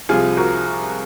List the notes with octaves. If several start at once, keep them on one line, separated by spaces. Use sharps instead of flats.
C2 C3 F3 F4 G#4
F#4 A#4